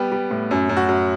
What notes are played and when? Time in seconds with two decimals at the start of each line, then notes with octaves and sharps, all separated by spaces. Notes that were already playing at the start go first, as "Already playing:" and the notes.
Already playing: G3 B3 G4
0.12 G3
0.31 A2
0.51 F#2
0.69 F#2
0.76 F#4
0.89 F#2